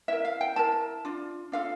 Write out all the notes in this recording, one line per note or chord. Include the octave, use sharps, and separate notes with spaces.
E4 A#4 E5
F5
G5
E4 A#4 A5
D4 F4
D4 F4 A4 F5